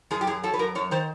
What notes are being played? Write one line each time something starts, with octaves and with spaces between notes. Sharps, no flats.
F#2 G#4
G4
F#2 G#4
F#3 A4
B4
F#2 A#4
F#2 C#5
D#3 C5